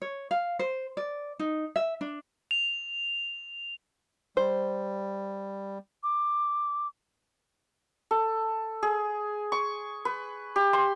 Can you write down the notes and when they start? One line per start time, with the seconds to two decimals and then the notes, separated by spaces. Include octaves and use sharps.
0.02 C#5
0.31 F5
0.59 C5
0.97 D5
1.39 D#4
1.76 E5
2.01 D4
2.51 F7
4.37 G3 C5
6.03 D6
8.11 A4
8.83 G#4
9.52 C#6
10.05 B4
10.56 G4
10.73 C6